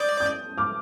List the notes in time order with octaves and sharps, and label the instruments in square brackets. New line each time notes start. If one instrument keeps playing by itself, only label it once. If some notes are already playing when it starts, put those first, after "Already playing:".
Already playing: [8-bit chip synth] D5 [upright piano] D#6 G6
[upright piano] D#6 G6
D6 F6